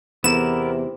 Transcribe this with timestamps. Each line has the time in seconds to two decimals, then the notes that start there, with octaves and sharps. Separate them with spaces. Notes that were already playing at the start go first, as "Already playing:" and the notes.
0.24 E2 C3 B3 E4 A#4 E7